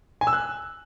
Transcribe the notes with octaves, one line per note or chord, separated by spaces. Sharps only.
G#5
E6
F#6